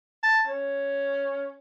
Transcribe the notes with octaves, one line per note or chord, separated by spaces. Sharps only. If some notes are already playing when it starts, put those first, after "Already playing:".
A5
C#4